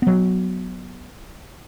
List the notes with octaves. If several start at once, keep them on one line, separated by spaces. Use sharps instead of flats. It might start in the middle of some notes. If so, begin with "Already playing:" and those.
F#3 B3